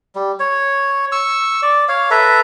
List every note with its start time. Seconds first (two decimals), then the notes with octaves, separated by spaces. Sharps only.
0.15 G3
0.40 C#5
1.12 C#6 E6
1.62 D5
1.88 C#5 F5
2.11 A4 B4 E5 A#5